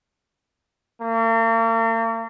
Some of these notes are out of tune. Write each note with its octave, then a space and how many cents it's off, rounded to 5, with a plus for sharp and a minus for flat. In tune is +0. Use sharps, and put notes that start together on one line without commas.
A#3 -45